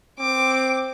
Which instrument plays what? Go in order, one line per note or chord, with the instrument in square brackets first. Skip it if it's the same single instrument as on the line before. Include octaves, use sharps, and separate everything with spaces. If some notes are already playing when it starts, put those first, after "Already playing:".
[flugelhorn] C4 [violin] D6